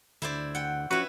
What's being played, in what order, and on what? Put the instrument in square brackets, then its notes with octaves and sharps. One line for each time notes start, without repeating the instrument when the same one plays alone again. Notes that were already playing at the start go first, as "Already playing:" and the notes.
[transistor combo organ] D2 [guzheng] E4 C5 D5
[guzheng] F#5 G5
[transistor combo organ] F3 C#4 [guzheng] E4 B4 [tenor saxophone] F#4